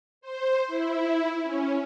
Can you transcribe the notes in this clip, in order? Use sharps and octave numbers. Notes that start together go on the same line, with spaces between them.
C5
E4
C#4